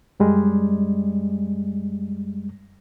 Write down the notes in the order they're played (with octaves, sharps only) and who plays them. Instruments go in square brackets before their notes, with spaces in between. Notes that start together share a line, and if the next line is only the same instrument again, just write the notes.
[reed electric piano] F#2 G3 G#3